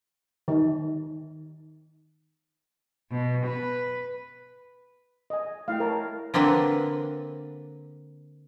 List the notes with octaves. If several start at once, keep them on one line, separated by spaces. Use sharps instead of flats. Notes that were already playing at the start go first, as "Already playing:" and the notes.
D#3
B2
B4
D#5 G#5
A3 E4 F5 G5
A#4 C#5 A5
D3 A#3 C4 D4 B4